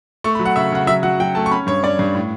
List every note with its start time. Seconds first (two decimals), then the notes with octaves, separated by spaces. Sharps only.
0.24 A3 C#6
0.35 B5
0.39 F#3
0.46 F#5
0.56 C#3 E5
0.72 C#3 F#5
0.87 F#3 E5
1.03 F#3 F#5
1.20 F#3 G5
1.35 A3 A5
1.46 C#6
1.51 C#4 B5
1.67 G2 C#5
1.83 C#4 D5
1.99 G2
2.15 A2